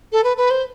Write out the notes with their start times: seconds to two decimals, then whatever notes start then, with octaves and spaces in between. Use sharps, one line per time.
0.12 A4
0.24 B4
0.37 B4
0.51 C5